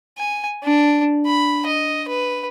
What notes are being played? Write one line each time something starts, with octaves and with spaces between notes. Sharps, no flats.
G#5
D4
B5
D#5
B4